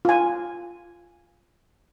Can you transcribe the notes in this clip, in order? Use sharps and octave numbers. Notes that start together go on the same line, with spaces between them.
F4 G#5